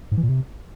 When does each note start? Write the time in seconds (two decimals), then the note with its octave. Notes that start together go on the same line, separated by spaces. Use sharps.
0.11 G#2
0.17 E3
0.23 A#2
0.29 C3